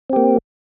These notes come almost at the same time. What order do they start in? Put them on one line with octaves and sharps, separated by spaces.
C4 G4 A#3